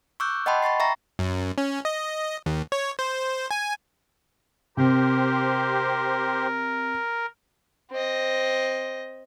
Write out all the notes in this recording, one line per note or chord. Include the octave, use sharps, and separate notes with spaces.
C#6 D6 E6 F#6 G6
D#5 F#5 G5 A5 B5 C6
B5 C#6 A6 C7
E5 G5 A#5 C#6 A#6
F#2
C#4
D#5
D#2
C#5
C5
G#5
C3 G4 A#4 C5
C4 D#5